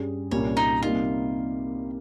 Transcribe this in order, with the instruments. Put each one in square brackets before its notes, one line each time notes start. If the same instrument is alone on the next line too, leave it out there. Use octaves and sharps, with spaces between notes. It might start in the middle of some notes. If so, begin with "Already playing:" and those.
Already playing: [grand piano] G2 G3 C#4 G#4
[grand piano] C2 A#2 G3 A#3 C#4 [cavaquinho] C#5
[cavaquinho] D#4
[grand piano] C3 G3 A#3 D#4 [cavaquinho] F4